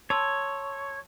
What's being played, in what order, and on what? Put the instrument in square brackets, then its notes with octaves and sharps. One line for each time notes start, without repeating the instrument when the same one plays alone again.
[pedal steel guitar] C#5 [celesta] A5 C6 E6